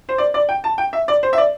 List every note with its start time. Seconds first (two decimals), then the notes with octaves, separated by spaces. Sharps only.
0.09 C5
0.18 D5
0.34 D5
0.49 G5
0.64 A5
0.78 G5
0.93 E5
1.08 D5
1.23 C5
1.33 E5
1.38 D5